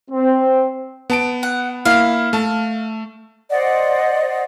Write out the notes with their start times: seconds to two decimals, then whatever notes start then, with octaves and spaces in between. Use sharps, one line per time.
0.10 C4
1.10 B3 A5 D7
1.43 F#5
1.85 A#3 E4 F5
2.33 A3 A5
3.50 C5 D5 D#5 F#5